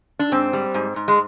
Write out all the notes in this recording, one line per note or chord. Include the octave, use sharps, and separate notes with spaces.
D4
G#2 C4
G3
G#2
G#2
G#3